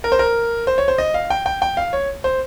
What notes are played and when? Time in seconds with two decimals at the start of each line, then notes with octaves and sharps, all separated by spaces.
0.04 A#4
0.12 C5
0.19 A#4
0.67 C5
0.78 C#5
0.88 C5
0.98 D#5
1.14 F5
1.30 G5
1.46 G5
1.62 G5
1.77 F5
1.93 C#5
2.24 C5